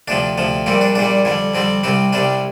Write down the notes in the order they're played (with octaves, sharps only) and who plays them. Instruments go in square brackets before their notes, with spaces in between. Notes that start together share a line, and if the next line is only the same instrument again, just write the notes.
[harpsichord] D2 C3 F3 D4
D2 C3 F3
A#1 A#2 G3 C4
D4
A#1 A#2 G3 D4
F2 D3 G3
F2 D3 G3 C4
C2 C3 G3 C4
C2 C3 G3 D4